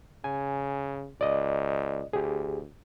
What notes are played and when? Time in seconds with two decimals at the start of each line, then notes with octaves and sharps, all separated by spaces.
0.24 C#3 G#5
1.21 C#2 D5 D#5
2.13 D2 G4 G#4